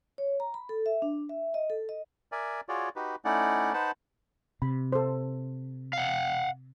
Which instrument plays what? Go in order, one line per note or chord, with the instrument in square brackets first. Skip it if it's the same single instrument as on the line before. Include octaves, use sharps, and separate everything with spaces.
[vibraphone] C#5
A#5
B5
A4
E5
D4
E5
D#5
A4
D#5
[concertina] A#4 D5 E5 G#5
F4 F#4 G#4 C#5 D5
D#4 F#4 G4 B4
A3 C#4 D#4 E4 D5 F#5
D#4 B4 C5 F#5 A5
[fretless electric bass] C3 [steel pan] B5
[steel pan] A4 C5
[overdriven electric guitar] F5 F#5